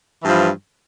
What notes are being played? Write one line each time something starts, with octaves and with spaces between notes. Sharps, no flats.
G2 E3 F3